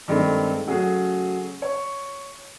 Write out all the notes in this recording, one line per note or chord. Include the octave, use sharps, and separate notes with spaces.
G2 D#3 G#3 A3 C4
C#3 F#3 A3 G#4
C#5